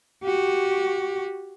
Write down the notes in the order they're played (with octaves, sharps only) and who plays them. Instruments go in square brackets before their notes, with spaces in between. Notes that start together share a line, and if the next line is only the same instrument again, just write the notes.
[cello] F#4 G4